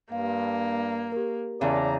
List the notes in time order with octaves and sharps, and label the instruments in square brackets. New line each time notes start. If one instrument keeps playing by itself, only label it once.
[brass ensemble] G2 [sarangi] A#3 [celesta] F5
[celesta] G4 A#4
[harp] E2 C#3 [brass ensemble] D5 A5 A#5